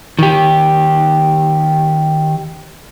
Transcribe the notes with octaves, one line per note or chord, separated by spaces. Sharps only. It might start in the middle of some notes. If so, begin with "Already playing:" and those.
D#3 G4